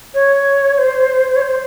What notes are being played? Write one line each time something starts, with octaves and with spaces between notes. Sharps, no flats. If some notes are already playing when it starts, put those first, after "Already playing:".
C#5
C5
C#5
C5